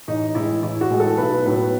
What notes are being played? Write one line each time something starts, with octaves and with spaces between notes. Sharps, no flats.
A1 D#4
A2 E3 G#3 E4
A1 E4
F#4
A2 E3 G#3
A4
B1 B4
A2 F#3 B3 B4